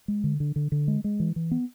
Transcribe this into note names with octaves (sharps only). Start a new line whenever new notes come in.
G#3
D3
D3
D3
D3
G#3
G#3
E3
E3
B3